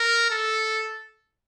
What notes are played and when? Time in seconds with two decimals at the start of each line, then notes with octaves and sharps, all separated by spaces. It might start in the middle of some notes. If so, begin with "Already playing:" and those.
Already playing: A#4
0.31 A4